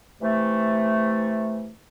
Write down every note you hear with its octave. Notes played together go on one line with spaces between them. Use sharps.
C3 E3 A3